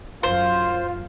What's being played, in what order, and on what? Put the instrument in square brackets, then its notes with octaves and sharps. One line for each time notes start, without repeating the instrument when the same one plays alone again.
[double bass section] F#2 [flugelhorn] F4 [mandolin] C5 [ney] F5